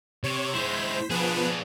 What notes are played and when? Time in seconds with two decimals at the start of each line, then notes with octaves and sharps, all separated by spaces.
0.24 C3 C#5
0.54 G#3 E4 C5 B6
1.10 F3 B3 D4 G#4 B4